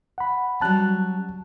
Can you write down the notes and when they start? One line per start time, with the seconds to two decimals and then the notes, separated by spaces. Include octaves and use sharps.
0.18 F#5 B5
0.61 F#3 G3 C#4 A5 F#6